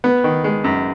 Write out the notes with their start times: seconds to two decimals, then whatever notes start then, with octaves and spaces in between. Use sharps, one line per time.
0.04 B3
0.24 D#3
0.44 G#3
0.64 F#2